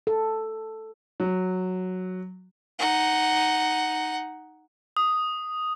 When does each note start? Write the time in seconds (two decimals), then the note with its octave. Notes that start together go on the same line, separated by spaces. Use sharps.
0.07 A4
1.20 F#3
2.79 D#4 F#5
4.97 D#6